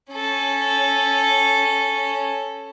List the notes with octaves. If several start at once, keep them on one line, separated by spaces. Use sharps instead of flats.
C#4 A4